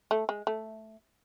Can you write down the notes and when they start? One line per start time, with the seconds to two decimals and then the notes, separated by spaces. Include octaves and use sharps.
0.11 A3
0.29 G#3
0.47 A3